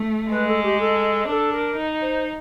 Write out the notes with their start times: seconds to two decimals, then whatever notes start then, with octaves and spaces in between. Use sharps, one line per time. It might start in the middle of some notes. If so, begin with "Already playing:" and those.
Already playing: A3
0.31 G#3 B4
0.47 A4
0.63 G4
0.79 A4
1.28 D4 A4 A#4
1.52 A#4
1.77 D#4
2.01 C5